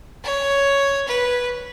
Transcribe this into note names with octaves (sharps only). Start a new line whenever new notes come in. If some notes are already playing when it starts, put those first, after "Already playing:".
C#5
B4